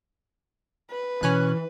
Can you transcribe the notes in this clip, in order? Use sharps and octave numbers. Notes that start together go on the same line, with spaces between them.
B4
B2 E3 C#4 G#5 F#6